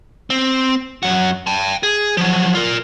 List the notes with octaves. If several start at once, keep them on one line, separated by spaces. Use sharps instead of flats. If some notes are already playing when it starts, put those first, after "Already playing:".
C4
F#2 F#4
G5 A5
G#4
F3 F#3
F4 A#4